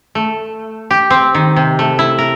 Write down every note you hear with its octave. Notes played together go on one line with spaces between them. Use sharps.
A3
G4
C4
D#3
C3
A3
E4
A#4